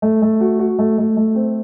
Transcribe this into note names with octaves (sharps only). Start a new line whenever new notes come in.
A3
A3
F#4
F#4
A3
A3
A3
C4